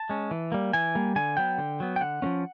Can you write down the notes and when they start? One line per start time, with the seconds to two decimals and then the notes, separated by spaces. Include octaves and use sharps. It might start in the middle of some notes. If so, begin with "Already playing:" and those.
Already playing: A5
0.09 G#3 C#4
0.31 E3
0.52 G3 A#3
0.73 E3 G#5
0.95 G3 A#3
1.16 D3 G#5
1.37 F#3 B3 G5
1.58 D3
1.80 F#3 B3
1.96 G5
2.01 D3 F#5
2.22 F3 A#3 C#4